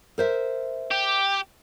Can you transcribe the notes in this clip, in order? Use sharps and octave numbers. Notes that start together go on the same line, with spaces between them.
A#4 C5 E5
G4